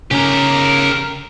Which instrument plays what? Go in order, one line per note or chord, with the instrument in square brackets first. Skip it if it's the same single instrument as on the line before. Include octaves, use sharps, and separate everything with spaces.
[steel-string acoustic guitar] C#3 [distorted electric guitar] G4 A#4